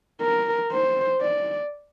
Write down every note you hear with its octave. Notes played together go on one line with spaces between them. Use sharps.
A#4
C5
D5